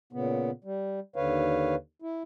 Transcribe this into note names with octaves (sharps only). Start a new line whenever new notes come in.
A#2 C#3 B3
G3
D#2 D3 B4 C#5 F5
E4